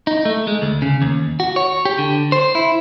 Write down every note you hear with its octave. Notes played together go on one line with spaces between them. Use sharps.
D#4
A3
G#3
D2
C#3
D#2
F#4
C#5
G4
D3
C5
E4